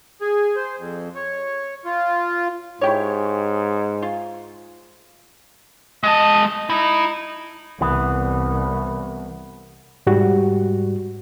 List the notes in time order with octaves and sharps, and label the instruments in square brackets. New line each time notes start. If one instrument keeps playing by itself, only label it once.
[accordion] G#4
C5
F2
C#5
F4
[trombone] G#2 [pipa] E4 G4 C#5
[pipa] F4
[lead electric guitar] G#3 A5 [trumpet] D#5
[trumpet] D#4 [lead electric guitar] E4
[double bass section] C2 [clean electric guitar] E3 B3
[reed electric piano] G#2 G3 F#4 G4